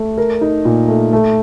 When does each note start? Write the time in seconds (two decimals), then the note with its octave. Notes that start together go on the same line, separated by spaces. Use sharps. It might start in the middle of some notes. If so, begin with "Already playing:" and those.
Already playing: A3
0.18 A#4
0.41 D#4
0.65 A#2
0.88 A3
1.13 A3